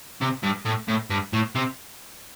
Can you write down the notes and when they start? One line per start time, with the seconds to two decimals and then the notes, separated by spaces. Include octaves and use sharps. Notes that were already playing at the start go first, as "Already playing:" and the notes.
0.21 C3
0.43 G2
0.66 A2
0.88 A2
1.10 G2
1.33 A2
1.55 C3